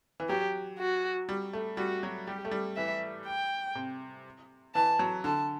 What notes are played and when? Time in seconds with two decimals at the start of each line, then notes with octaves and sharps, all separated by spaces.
0.20 E3
0.29 F#3 G4
0.79 F#4
1.29 G3
1.53 A3
1.77 G3 F#4
2.03 F#3
2.27 G3 G4
2.45 A3
2.51 G3
2.77 E3 E5
3.26 G5
3.75 C3
4.75 E3 A5
4.99 F#3
5.24 D3 A5